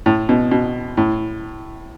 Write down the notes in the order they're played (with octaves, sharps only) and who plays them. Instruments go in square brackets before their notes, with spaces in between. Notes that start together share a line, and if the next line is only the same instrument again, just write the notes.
[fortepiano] A2
B2
B2
A2